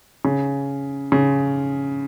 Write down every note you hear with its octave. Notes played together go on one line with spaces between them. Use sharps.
C#3
C#3